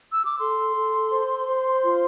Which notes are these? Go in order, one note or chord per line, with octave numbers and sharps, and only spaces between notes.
E6
D6
A4 C6
A4
C5
C5
F4